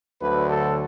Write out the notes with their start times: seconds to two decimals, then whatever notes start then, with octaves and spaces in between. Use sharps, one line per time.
0.19 D2 D3 F#3 B4
0.50 A4